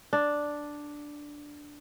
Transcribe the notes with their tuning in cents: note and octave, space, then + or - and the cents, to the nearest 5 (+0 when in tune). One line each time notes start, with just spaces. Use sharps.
D4 +0